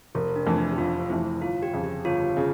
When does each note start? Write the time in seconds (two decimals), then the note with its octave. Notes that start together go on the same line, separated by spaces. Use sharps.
0.15 F1 A#4
0.36 D4
0.47 F2 E3 A3
0.57 D4
0.72 G4
0.78 F1 F4
1.10 F2 E3 A3 E4
1.42 G1 F4
1.63 G4
1.73 F2 C#3
1.84 G4
2.05 G1 F4
2.37 C#3